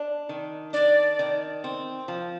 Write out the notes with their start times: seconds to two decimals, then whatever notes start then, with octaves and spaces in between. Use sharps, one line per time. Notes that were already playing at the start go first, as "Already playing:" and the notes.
Already playing: D4
0.29 D#3
0.73 D4 D5
1.19 D#3
1.64 C4
2.08 F3